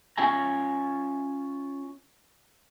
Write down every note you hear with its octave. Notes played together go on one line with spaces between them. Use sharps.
C#4 F4 E5 G#5 A#5